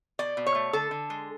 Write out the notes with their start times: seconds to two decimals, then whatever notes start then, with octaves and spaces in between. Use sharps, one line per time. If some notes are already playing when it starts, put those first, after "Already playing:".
0.19 B2 D5
0.37 B2
0.46 C#5
0.55 A3
0.73 D3 A4
0.91 D3
1.10 G#3